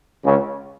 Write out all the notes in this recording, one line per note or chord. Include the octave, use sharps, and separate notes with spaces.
C#2 C#3